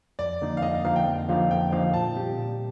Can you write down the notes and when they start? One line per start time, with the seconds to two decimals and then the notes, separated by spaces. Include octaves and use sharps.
0.19 F2 D5
0.41 D3 F3 A#3 D#4
0.57 F5
0.62 F2 D#5
0.74 F5
0.85 D3 F3 A#3 D#4 F5
0.96 G5
1.07 F2
1.29 D3 F3 A#3 D#4 F5
1.51 F2 G5
1.72 D3 F3 A#3 D#4 F5
1.93 A#2 A5
2.16 G3 C4 G4
2.38 A#2